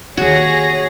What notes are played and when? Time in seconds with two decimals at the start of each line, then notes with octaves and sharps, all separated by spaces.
0.17 D#2 D3 F#4 G#4 C#5 A#6